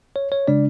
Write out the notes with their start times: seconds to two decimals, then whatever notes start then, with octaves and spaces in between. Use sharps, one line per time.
0.16 C#5
0.32 C#5
0.48 C#3 G#3 D4 D5